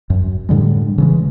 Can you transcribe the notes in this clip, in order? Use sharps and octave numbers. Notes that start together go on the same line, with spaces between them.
F#2
A2 D3 G3 G#3
C#3 E3 G#3